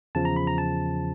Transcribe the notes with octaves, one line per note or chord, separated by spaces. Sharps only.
E2 C#3 F3 A5
A#5
B5
A#5
A5